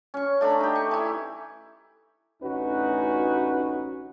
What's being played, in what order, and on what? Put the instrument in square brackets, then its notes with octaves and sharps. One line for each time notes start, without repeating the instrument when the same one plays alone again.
[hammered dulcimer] C#4 C#6
A3 D4 A#5 B5
D#4 G4
C#6
E3 E4
[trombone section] A1 D2 C#4 D#4 F#4 B4